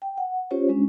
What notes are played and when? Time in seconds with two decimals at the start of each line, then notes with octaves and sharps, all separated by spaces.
0.02 G5
0.18 F#5
0.51 C#4 F4 G4 C5 C#5
0.69 G#3 C#4 D4